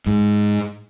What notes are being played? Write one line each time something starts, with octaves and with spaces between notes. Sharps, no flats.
G#2